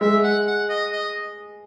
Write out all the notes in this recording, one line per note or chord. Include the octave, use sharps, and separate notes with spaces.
G#3 E5
F#5
F#5
D#5
D#5